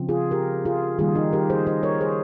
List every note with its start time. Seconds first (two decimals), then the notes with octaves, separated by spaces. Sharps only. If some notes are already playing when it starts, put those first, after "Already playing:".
Already playing: C#3 F3 C4
0.09 F4 G#4
0.31 G4 A#4
0.65 F4 G#4
0.99 D#3 G3 A#3 F4 G#4
1.15 D#4 G4
1.33 G4 A#4
1.50 G#4 C5
1.67 C5 D#5
1.83 A#4 C#5
2.01 G#4 C5